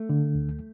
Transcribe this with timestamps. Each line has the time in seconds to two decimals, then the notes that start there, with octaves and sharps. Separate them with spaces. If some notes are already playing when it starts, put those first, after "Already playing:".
Already playing: A3
0.09 D3
0.35 D2